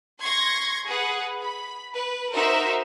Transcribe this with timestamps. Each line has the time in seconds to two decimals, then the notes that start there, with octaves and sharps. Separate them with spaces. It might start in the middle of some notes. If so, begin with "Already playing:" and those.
0.21 C6 C#6 G#6 A#6
0.86 G#4 B4 F#5
1.42 B5
1.94 B4
2.34 D#4 F#4 A#4 C5 E5